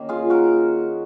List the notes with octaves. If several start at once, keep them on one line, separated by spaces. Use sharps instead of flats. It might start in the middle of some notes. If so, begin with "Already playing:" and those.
Already playing: D#3 A#3 C#4
F4 G#4
F#4 A#4